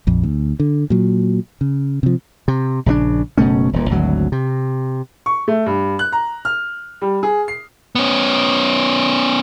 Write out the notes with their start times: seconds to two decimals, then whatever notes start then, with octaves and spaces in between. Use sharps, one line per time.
0.07 A#1 F2
0.23 D2
0.60 D3
0.90 A#2 F#3
1.61 C#3
2.03 C3 F3
2.48 C3
2.86 A#1 C#3 G3 D4
3.38 F#1 B2 A3 C#4
3.73 D#1 A#2
3.90 G#1 D2 F#3
4.32 C3
5.26 C#6
5.48 A3
5.66 G2
5.99 F#6
6.12 A#5
6.45 F6
7.01 G3
7.23 G#4
7.48 C7
7.95 B3 C#4